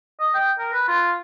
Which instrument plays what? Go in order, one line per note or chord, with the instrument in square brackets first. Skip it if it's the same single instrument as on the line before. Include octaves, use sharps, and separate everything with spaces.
[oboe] D#5
G5
A#4
B4
F4